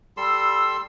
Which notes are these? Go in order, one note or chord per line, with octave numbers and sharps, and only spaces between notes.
G3 A4 C6 E6